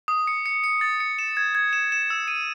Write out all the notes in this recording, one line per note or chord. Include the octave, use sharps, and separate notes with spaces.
D#6
C#7
C#7
C#7
A6
C#7
E7
G#6
G#6
E7
E7
E6
D#7